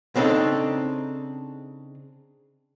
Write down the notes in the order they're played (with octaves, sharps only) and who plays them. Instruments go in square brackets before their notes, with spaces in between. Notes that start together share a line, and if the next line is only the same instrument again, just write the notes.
[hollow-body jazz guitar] C#3 C4 D4 D#4 A4